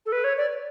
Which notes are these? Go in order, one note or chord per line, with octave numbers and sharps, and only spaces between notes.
A4
B4
C#5
D5